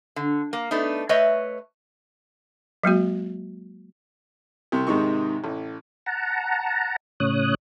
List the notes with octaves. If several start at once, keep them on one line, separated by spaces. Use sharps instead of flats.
D3
A#3
A3 B3 D4 D#4
A3 B4 C#5 D#5 E5
F#3 G#3 A#3 F#4
C2 C3
G#2 C3 D#3 D#4 C#6
A1
F#5 A5 A#5
A2 C#3 C#5 D#6 F#6